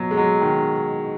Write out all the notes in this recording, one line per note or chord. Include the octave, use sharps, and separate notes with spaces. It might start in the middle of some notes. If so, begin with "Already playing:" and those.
Already playing: B2 F#3
G#3
F#3
D#3